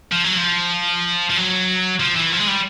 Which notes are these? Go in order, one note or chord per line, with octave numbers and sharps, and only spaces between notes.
F3
F#3
F3
F3
F#3
F3
E3
F3
G#3
G3